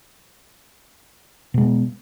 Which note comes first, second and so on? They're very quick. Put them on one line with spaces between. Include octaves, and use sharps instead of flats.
B2 G#3 B3